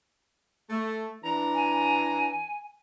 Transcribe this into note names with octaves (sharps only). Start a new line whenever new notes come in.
A3
E3 D4 A#5
G#5